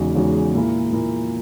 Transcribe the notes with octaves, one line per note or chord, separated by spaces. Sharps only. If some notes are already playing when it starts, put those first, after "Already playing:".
Already playing: E2 C#3 G#3 D#4 F#4
E2 C#3 G#3 D#4 F#4
A#2 A#3 E4 A#4
A#2 A#3 E4 A#4